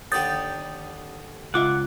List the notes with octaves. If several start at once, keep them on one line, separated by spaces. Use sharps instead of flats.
D#2 D3 G4 D#6 G6 A6
C#2 F4 E5 F#5 D6